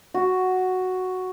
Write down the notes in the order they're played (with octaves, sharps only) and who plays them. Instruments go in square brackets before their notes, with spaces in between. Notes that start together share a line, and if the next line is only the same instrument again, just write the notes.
[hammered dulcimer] F#4